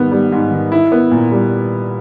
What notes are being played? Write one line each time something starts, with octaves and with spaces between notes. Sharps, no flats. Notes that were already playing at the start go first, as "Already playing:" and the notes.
Already playing: G#2 D#3 G3 B3
G3
G#2
D#3
E4
B3
A#2
G3